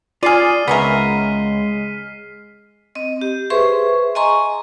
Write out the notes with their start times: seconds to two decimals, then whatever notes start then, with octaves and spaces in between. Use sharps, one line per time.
0.23 F4 G#4 D5 F6 C7 D#7
0.68 C#2 G#3 B3 C#4 A#4 E5 B6
2.95 C4 D#5
3.21 G4
3.50 G#4 B4 C5 E5 C6 C#6
4.15 D#5 G#5 A#5 C6 C#6